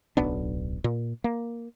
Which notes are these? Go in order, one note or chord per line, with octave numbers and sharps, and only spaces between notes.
D1 B1 B3 D4
A#2
A#3